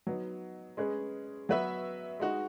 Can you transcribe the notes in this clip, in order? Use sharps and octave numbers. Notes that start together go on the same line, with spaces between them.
F#3 B3 D#4
G#3 C#4 G#4 B4
F#3 B3 F#4 B4 E5
G#3 D#4 F#4